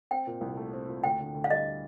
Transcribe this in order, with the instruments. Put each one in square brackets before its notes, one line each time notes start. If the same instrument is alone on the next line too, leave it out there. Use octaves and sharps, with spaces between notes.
[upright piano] C4 [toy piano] G5
[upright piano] A#2
C2
A3
C4
A#2
[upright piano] D2 [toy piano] G5
[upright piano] D3
D2
[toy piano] F5
[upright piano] G3 [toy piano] D#5